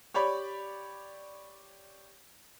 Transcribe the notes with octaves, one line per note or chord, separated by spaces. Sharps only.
G4 C#5 D5 B5